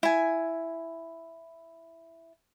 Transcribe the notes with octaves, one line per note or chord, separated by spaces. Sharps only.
E4 G#5